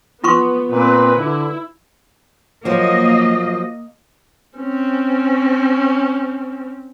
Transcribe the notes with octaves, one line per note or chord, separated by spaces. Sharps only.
B3 F4 C6 C#6
A#2 C4 B4
D3 E4
F3 F#3 A#3 D#5
C4 C#4